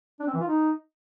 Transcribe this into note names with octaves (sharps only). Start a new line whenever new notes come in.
D4
C4
E3
F4
D#4